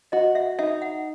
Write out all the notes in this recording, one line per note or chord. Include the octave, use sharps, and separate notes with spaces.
F#4 D#5
E5
D#4 E5
F#5